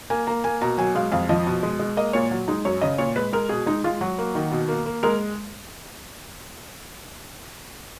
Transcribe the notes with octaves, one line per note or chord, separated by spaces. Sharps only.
A#3 G#5
A#3 A#5
A#3 G#5
B2 A#5
F#3 G#5
G#3 F5
F2 F5
F3 D#5
B2
G#3
G#3
A#3 D#5
A#2 C#5
F#3
G#3 D#4
F#2 C#5
C#3 D#5
A#2 C#5
G#3 B4
G#3 A#4
B2 G#4
G#3 D#4
G#3 F4
F#3 F#4
A#3
D#3
B2
A#3
A#3
G#3 A#4